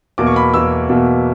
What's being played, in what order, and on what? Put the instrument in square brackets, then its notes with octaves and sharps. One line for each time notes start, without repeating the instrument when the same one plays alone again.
[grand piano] E2 B2 A#3 D6
C#6
B5
E2 B2 A#3 E6
E2 B2 A#3